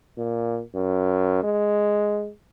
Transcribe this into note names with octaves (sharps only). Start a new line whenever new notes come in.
A#2
F#2
G#3